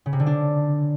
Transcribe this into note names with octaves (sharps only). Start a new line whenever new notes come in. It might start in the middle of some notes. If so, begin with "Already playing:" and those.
C#3
C3
D3
D4